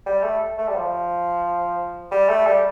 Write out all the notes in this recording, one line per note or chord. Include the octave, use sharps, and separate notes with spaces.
G3
A3
A3
G3
F3
G3
A3
G3